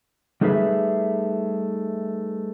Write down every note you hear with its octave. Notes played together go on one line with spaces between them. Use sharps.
G3 A3 D#4 G#4 B4 E5